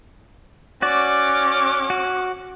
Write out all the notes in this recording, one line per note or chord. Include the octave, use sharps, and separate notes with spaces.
C#4 F#4 D5 D6
F#4